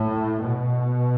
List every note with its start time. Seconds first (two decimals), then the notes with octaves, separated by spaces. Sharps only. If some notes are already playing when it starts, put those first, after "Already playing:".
Already playing: A2
0.44 B2